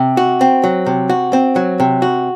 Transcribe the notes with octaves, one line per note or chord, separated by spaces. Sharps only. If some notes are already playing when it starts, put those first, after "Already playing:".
Already playing: C3
F#4
C4
F#3
C3
F#4
C4
F#3
C3
F#4